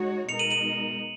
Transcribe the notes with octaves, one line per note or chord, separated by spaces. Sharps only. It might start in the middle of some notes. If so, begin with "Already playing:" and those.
Already playing: G#3 D#4 F#4 C#5
B2 G#3 D#4 A#4 C#7 F7
D#7 F#7
D#7 F#7